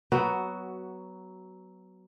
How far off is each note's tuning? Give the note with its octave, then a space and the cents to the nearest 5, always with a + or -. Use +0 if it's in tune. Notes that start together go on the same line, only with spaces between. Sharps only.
F#3 +15 B3 +0 F#4 +5